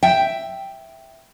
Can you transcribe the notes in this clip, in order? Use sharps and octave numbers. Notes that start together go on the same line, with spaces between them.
E5 G5